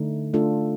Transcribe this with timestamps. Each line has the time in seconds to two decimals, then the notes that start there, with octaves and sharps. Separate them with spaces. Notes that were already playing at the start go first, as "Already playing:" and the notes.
Already playing: D3 A3 D#4
0.34 A3 D4 F4 A4